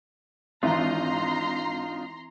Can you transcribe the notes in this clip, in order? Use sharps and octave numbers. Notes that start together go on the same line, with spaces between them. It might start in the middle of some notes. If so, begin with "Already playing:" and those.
G#1 E3 D4 D#4 F4 E5 A#5 C6